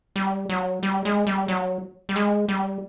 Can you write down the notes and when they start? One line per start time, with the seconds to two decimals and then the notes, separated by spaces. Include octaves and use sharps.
0.16 G3
0.49 F#3
0.83 G3
1.05 G#3
1.27 G3
1.48 F#3
2.09 G3
2.16 G#3
2.48 G3